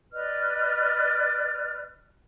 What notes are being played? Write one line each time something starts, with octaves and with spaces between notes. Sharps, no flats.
B4 D5 D#5 F6